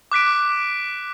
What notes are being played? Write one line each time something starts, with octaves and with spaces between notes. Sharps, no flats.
D6 F#6 B6 D7